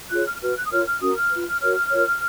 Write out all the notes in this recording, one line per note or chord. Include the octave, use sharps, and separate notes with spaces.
F4 G#4 C#5 F#6
F6
F#4 B4 F6
F#6
D#6
F4 A#4 C#5 F6
F6
C#4 F#4 A#4 D#6
F6
F4 B4
F#4 A#4 C#5 F6
F4 A#4 C#5